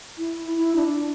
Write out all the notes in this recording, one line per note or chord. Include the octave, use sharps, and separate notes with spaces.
E4
E4
D4